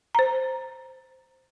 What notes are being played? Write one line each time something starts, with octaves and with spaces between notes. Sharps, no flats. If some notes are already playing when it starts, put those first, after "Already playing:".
C5 A#5